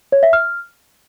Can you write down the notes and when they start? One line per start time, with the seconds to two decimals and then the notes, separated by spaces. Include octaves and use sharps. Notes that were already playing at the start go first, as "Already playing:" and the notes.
0.12 C#5
0.23 E5
0.33 F6